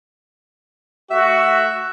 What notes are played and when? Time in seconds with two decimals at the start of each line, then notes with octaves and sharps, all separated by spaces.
1.10 A3 F#4 E5